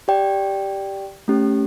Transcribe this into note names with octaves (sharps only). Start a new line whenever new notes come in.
G4 D5 G5
A3 C#4 G4